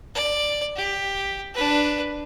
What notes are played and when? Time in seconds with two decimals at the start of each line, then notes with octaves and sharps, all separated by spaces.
0.14 D5
0.76 G4
1.54 D4 B4